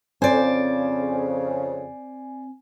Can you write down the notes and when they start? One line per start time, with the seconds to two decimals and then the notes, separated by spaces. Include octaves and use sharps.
0.22 F2 C#3 C4 C5 D5 G#5